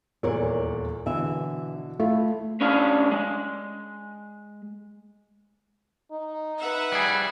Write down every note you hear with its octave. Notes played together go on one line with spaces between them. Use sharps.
D#1 E2 A#4 C#5 D5
B2 D3 E3 E5
A3 E4 F4
A2 C#4 D4 F5
G#3
D#4
B4 E5 F#5
G3 G#4